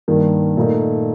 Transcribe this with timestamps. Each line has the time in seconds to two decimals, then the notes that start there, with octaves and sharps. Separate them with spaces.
0.08 G2 D#3 A#3
0.57 A#2 A3 D#4 A#4